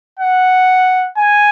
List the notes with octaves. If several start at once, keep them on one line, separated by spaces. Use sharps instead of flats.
F#5
G#5